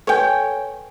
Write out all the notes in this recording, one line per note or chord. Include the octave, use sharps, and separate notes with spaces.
A4 B4 C#5 G5 G#5